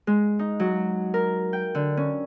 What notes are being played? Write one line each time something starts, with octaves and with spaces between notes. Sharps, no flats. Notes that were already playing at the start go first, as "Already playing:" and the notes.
G#3
D#4
F#3
A#4
G5
D3
C#4